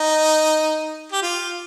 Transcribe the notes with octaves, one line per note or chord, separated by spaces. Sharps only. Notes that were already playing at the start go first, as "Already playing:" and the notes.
Already playing: D#4
G4
F4